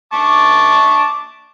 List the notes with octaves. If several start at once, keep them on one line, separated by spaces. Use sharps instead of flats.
A5 C#6 D6